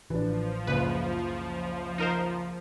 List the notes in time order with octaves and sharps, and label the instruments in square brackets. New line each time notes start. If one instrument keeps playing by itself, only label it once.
[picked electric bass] A1 E3 [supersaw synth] F3 [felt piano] D4 B4
[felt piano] F#1 C#2 [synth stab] B4
[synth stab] D#4 A#4 C5